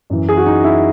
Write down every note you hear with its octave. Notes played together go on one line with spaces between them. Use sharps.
F#2 E3
G#4
F#4
D#4
E4